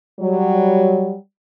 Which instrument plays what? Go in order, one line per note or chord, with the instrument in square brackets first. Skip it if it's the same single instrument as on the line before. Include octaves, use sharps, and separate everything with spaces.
[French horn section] F#3 G3